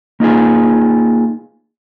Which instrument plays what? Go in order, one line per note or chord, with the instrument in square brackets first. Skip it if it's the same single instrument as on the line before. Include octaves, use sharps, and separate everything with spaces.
[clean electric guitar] A#3 D#4 F4 G#4